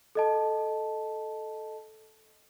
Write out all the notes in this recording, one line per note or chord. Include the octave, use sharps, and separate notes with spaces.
A4 D#5 A5